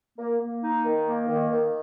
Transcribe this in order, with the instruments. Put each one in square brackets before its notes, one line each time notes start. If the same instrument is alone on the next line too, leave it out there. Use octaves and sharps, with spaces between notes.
[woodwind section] A#3
A#3
D#4
D#3
A#3
D#3
D#3